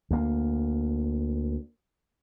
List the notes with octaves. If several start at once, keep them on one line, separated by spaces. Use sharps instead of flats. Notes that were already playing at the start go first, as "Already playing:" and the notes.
D2 A#3